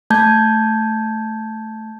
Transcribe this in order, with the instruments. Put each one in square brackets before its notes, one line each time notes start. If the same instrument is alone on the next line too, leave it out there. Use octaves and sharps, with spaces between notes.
[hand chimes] A3 A5 G6 G#6